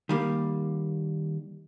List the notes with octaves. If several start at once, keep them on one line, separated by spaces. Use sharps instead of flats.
D#3 G3 A#3